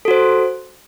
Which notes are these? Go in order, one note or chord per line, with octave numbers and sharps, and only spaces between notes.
F#4 A4 C5